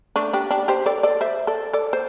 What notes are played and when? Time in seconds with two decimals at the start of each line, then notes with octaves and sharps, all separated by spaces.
0.16 A3 D4
0.33 D4 G4
0.51 D4 G4
0.68 G4 C5
0.86 A4 D5
1.03 A4 D5
1.21 C5 E5
1.47 A4 D5
1.73 A4 D5
1.93 C5